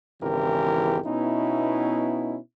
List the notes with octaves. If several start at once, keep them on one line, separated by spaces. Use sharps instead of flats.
G#1 E2 C#3 E3 G4 A#4
B2 B3 C#4 D#4 E4